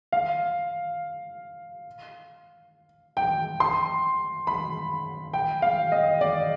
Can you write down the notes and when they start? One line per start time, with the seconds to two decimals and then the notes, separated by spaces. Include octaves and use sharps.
0.12 F5
3.17 G5
3.60 C6
4.47 B5
5.34 G5
5.62 F5
5.92 D#5
6.21 D5